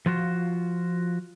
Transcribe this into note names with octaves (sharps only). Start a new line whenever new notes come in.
F3 F4 F#4